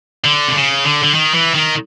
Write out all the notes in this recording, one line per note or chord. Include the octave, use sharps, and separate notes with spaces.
D3
C3
C#3
D3
D3
D#3
E3
D#3